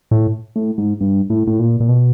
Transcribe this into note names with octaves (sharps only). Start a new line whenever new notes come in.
A2
A2
G#2
G2
A2
A2
A#2
A#2
B2